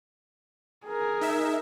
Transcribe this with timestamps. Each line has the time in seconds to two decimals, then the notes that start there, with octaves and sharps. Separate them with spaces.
0.87 G#4 A#4
1.21 D#4 E5